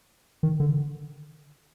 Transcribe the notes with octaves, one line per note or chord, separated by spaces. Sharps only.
D#3
D3